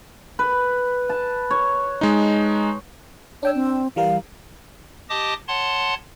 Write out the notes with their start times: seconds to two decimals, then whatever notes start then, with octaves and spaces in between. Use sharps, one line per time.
0.39 B4
1.10 A5
1.51 C#5
2.01 G#3 D#4
3.43 D4 C#5 G5 E6
3.55 C4
3.96 E3 G3 A#4 F5
5.10 G4 D#5 A5 D6 D#6
5.48 C#5 F#5 A5 C6